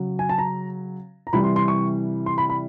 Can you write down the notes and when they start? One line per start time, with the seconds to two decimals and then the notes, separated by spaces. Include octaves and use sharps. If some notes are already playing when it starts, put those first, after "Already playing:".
Already playing: C#3 F#3
0.19 G#5
0.29 A5
0.38 A#5
1.27 A#5
1.33 C3 E3 G3 B5
1.44 C6
1.56 C6
1.68 C#6
2.26 C6
2.38 B5
2.50 B5